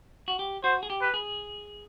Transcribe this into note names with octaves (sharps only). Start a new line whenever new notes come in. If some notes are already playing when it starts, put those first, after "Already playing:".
F#4
G4
F#4 C5
G#4
G4
B4
G#4